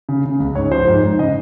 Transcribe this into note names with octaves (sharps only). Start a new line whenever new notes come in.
C#3
C#3
C#2
G#2 C#5
F3 C5
G#2
G#2
C#3 D#5